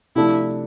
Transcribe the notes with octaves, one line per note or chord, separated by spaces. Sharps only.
C3 F3 A3 D4 E4